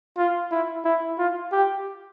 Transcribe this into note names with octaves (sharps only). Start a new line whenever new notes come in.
F4
E4
E4
F4
G4